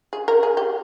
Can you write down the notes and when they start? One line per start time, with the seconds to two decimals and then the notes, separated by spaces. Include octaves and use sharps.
0.13 G#4
0.28 A#4
0.43 G#4
0.57 G4